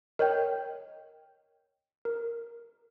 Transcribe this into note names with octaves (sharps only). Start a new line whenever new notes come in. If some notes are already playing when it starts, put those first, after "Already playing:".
A#4 C#5 D#5 G5 G6
A#4